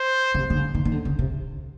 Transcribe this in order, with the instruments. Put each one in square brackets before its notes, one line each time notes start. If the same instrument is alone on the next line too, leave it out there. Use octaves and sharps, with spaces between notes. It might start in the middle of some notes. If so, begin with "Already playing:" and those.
Already playing: [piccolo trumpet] C5
[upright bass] C#3
C3
D3
C#3
D#3
D#3
D3
C#3
C3